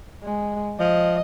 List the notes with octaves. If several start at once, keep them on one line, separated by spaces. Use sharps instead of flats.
G#3
F3 D#5